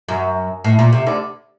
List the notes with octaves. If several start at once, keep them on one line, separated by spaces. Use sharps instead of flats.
F#2
A2
A#2
C3
D2 D3